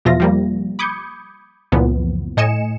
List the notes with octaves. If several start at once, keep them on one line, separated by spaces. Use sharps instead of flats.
E2 B2 F3 F4 E5 A#6
F3 G3 A#3
B5 D6 D#6 G6 G#6 C#7
C#2 F#2 A#2 E3 F3 B3
A2 D#5 G#5 C#7 E7